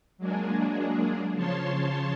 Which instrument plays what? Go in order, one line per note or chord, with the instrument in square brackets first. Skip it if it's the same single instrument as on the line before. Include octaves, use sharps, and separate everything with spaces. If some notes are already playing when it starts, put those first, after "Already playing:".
[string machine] F#3 G#3 A#3 D4 G#4
C#3 F3 C#5 A5 C6